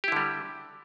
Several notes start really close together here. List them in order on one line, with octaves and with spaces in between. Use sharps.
G4 E4 D3 G3